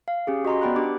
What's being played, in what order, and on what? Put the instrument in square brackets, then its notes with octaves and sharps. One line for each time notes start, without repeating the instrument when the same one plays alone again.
[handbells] F5
C#4 G4 G#4
F#4 D#5 A#5 C6
B3 D5 G5 B5 F#6
D4 G4 D6